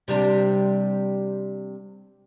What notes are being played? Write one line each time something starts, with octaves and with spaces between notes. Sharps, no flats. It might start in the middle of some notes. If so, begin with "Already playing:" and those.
C3 G3 D4